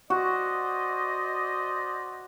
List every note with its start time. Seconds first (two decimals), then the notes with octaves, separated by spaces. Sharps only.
0.10 F#4 C5 D5 D#5